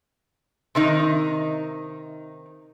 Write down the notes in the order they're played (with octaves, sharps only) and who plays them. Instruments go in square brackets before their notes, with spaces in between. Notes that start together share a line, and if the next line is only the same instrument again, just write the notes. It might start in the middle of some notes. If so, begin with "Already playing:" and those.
[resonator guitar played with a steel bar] C3 D#3 D#4